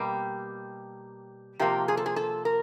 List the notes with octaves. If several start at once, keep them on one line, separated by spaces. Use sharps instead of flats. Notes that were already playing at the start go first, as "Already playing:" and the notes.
Already playing: B2 G3 A#3 G4
C3 F3 A#3 G4
G#4
A4
G#4
A4
A#4